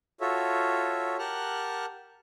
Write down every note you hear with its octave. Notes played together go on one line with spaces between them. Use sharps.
F4 F#4 A4 C#5 E5
G4 A#4 F#5 A5 F6 F#6